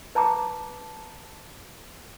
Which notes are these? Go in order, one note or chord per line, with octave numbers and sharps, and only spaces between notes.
B4 A5 A#5 D6